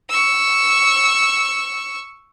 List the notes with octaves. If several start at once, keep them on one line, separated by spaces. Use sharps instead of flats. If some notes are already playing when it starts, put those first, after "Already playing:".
C#6 E6